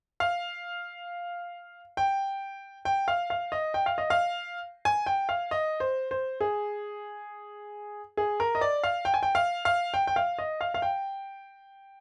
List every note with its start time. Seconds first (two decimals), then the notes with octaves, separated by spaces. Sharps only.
0.20 F5
1.97 G5
2.85 G5
3.08 F5
3.30 F5
3.52 D#5
3.74 G5
3.86 F5
3.98 D#5
4.10 F5
4.85 G#5
5.06 G5
5.29 F5
5.51 D#5
5.80 C5
6.11 C5
6.41 G#4
8.17 G#4
8.40 A#4
8.55 D#5
8.61 D5
8.84 F5
9.05 G5
9.14 G#5
9.23 G5
9.35 F5
9.65 F5
9.94 G5
10.07 G5
10.16 F5
10.39 D#5
10.61 F5
10.74 F5
10.82 G5